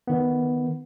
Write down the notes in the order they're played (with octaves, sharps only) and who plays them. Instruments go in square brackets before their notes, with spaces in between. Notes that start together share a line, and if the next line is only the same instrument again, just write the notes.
[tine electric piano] D#3 B3